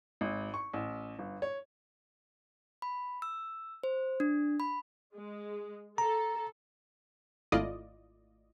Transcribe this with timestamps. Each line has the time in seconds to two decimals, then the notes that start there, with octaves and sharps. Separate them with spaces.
0.21 G#1
0.54 C#6
0.73 A1
1.19 G1
1.42 C#5
2.82 B5
3.22 E6
3.84 C5
4.20 D4
4.60 B5
5.15 G#3
5.98 A4 A#5
7.52 G#1 A3 E4 F4 D5 D#5